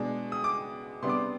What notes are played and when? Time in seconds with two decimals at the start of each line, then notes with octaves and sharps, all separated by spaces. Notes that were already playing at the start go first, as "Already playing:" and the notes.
Already playing: B2 G#3 D4
0.32 D#6
0.44 D6
1.02 C3 G3 B3 D4 C6
1.09 D6
1.17 C6